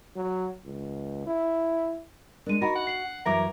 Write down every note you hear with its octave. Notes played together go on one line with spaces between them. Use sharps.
F#3
C#2
E4
G#3 D4 A#4 D#7
D#4 F#4 A#4 D#5 B5
F#5
C7 F#7
F#2 E3 F#3 A#4 E5 D6